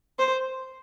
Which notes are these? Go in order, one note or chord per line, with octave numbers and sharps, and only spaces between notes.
C5